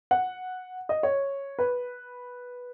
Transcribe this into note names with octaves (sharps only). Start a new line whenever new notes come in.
F#5
D#5
C#5
B4